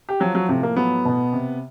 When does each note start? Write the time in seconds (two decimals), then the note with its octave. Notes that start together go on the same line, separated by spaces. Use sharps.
0.09 G4
0.20 F3 F#3 F#4
0.35 F#3 F#4
0.49 A2 C3 C4
0.63 A#3
0.76 F#3 B3
1.05 B2
1.33 C3